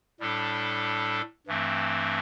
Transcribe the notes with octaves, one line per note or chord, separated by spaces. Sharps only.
A2 G3 D4 A4
G2 E3 A3 C4